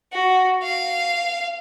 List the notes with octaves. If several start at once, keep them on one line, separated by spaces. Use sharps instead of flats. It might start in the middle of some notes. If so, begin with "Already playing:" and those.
F#4
F5